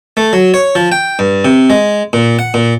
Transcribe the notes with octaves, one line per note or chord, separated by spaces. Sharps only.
A3
F#3
C#5
F3
G5
G2
C3
G#3
A#2
F#5
A#2